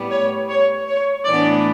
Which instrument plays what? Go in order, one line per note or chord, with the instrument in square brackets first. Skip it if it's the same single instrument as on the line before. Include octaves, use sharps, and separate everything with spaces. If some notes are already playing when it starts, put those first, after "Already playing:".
Already playing: [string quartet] A2 G3 B3
[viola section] C#5
C#5
C#5
[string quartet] A2 E3 B3 D4 [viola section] D5